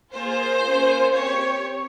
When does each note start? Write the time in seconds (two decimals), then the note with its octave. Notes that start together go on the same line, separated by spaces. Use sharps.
0.13 A#3 F4 G#4 C5
0.64 A#3 C#4 F4 G#4
1.16 C4 G4 C#5